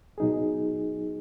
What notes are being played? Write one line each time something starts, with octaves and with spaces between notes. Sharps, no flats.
B2 F#3 D#4 G#4